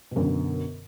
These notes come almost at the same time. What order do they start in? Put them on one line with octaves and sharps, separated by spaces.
B2 F#2 D3